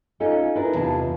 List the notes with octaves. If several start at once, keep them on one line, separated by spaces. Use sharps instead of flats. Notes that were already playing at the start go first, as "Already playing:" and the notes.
C#4 D#4 F4 A4 D#5
D4 E4 A#4 B4 D5
E2 C3 F4 B4 A5